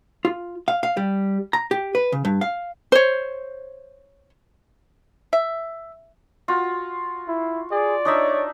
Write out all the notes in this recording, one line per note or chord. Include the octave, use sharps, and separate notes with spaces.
F4
F5
F5
G3
A#5
G4
B4
C#3
G2
F5
C5 C#5
E5
F4 F#4
E4
G#4 D5
D4 D#4 C#5 E5